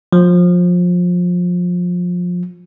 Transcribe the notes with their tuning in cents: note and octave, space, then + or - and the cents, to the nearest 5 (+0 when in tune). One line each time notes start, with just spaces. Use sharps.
F3 +25